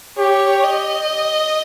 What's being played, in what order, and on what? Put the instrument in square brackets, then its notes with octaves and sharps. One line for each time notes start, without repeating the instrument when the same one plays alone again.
[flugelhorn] G4 [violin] C#5
[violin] D#5